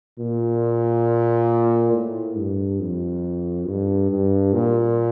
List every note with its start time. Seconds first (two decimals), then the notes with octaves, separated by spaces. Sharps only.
0.19 A#2
1.92 A2
2.37 G2
2.80 F2
3.67 G2
4.10 G2
4.53 A#2